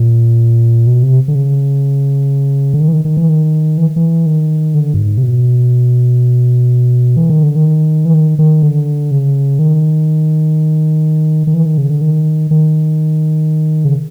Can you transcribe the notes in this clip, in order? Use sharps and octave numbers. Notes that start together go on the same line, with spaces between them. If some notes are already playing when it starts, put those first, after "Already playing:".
Already playing: A#2
B2
C3
D3
C#3
D3
D#3
E3
D#3
D#3
E3
D#3
E3
E3
D#3
D3
G2
G#2
C3
B2
E3
D#3
D3
D#3
E3
D#3
D#3
D3
C#3
D#3
D#3
E3
D#3
C#3
D3
D#3
D#3
C#3